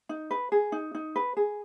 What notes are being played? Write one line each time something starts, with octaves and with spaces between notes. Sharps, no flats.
D#4
B4
G#4
D#4
D#4
B4
G#4